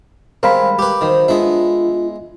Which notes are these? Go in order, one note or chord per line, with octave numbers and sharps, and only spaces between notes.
D#3 G3 G#3 C4 A#4 F5 B5
G4 B4
D#3 F#3 C4 C5
G#3 B3 D4 F4 E5